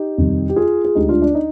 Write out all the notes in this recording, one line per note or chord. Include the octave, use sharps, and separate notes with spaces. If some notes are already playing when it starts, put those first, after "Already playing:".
Already playing: D#4 G4
F2 C3 D#3 G3
G4
F4 G#4
G#4
D2 D3 G#3 D#4 G4
D4 F4
D4
D#4